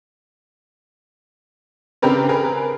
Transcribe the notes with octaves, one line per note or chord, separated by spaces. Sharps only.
C#3 C4 D4 G4 A#4 B4
G#4 A#4 B4